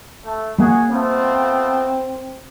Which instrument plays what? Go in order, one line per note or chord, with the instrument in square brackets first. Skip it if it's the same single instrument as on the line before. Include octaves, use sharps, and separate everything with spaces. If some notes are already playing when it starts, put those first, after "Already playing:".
[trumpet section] A3
[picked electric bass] G3 A#3 [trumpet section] F#4 G#4
[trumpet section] A3 B3 F4 [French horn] C4